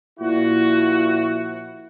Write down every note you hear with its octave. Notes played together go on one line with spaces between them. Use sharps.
A#2 F3 E4 F#4